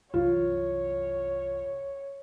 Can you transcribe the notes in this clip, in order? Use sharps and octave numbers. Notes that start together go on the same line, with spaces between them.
C2 F#2 E3 F4 C#5